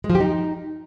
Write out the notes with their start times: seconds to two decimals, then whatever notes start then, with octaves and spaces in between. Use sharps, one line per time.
0.04 G#3
0.10 F3
0.15 G4
0.20 D#4